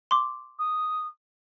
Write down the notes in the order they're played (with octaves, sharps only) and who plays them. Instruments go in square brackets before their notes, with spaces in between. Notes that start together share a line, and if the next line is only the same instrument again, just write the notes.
[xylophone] C6 D6
[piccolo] D#6